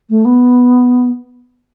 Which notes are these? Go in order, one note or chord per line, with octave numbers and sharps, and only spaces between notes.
A3
B3